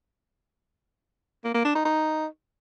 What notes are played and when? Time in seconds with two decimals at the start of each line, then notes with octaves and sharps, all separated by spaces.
1.44 A#3
1.55 A#3
1.65 D4
1.75 D#4
1.85 D#4